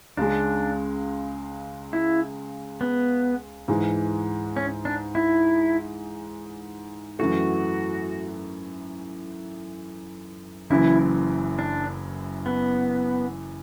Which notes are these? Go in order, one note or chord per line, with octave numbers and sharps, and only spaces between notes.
C#2 C#3 G#3 D4
E4
B3
G#2 E3 G#3
C#4
D4
E4
F#2 E3 A3 F#4
F#1 F#2 E3 E4
D4
B3